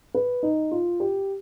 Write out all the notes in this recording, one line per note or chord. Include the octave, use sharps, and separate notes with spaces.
B4
D#4
F4
G4